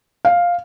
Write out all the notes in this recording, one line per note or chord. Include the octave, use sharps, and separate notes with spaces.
F5